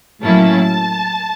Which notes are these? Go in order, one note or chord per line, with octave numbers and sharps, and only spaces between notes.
A2 F#3 A#3 C#4 E4 A5